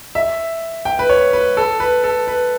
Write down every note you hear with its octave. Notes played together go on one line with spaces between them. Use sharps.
E5
G5
B4
C#5
B4
A4
B4
A4
B4